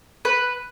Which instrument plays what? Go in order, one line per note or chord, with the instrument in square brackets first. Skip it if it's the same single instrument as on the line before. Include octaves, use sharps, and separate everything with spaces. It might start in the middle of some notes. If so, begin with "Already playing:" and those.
[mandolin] B4